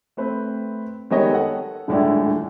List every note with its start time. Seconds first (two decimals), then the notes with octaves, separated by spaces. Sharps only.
0.17 A3 C4 B4 C5
1.10 D#3 G3 G#3 B3 C#5 D#5
1.30 A4 F#5
1.88 D#1 A2 D3 G#3 E4 D5